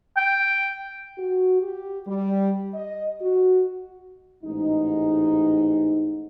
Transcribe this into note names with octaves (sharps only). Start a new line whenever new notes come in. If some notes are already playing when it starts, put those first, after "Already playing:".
G5
F#4
G4
G3
D#5
F#4
A1 G#2 G#3 D#4